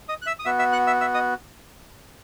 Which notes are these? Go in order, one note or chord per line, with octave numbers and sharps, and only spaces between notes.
D#5 D#6
F#6
E5 E6
D#6
B3 F#4 E5 E6
E5 E6
F#5 F#6
E5 E6
E5 E6
D#5 D#6